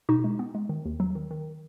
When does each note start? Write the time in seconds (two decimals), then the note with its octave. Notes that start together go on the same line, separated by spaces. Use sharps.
0.09 B2 D#4 F#4
0.24 G#3
0.39 B3
0.55 G#3
0.69 D#3
0.85 D#2
1.00 F#3
1.15 D#3
1.31 D#3